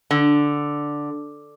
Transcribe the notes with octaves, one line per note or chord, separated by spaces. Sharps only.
D3